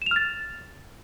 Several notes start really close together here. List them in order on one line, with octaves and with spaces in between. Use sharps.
E7 F7 F6 A6